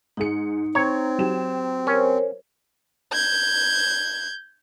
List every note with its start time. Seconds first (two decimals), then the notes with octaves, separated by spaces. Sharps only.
0.17 G#2 D#4 G#4 C#7
0.75 C4 C#5 A#5 G#6
1.19 F#3 G4 E7
1.87 C#4 A#4 C5 C#5
3.13 G6 G#6